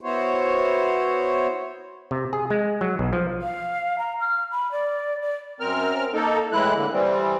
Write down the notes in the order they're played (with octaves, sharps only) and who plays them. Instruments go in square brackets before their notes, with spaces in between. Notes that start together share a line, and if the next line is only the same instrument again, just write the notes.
[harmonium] B3 E4 F#4 C5 C#5
[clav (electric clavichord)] C3
G#4
G#3
F#3
B1
F3
[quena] F5
A#5
F6
B5
D5
D5
[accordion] F#2 C4 A#4 F6
A#3 D#4 A4
A2 E3 G#3 E4 F#6
A2 D3 A#3
E3 G3 C4